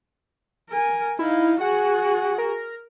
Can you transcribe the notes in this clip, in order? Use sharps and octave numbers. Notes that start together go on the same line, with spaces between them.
A#4 G#5
D#4 E4 F5
F#4 G#4 F#5
A#4